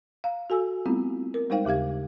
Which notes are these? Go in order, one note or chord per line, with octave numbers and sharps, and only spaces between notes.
F5 A#5
F#4 A4 G#5 E6
G3 A3 B3 C4 E4 F4
A#4
G3 G#3 D#4 C5 F5 G5
D#2 C#3 G4 F5 G#6